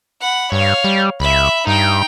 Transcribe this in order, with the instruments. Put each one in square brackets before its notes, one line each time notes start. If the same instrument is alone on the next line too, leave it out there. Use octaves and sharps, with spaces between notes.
[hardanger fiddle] F#5 B5
[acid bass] G2 [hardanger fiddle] C#5 F5
[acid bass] G3
[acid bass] C#2 [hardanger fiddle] E5 B5
[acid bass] G2 [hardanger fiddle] D#4 G5